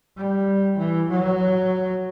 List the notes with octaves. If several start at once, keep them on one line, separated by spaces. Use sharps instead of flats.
G3
E3
F#3